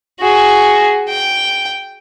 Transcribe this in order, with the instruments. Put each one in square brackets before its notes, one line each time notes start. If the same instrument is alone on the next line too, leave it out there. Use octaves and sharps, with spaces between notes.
[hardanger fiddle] F#4 G#4
G5